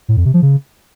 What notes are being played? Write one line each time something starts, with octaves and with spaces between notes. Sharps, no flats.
A2
F2
C3
F3
C#3